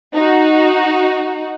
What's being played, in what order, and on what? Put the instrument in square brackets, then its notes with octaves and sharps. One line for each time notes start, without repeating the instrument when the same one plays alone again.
[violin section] D#4 F#4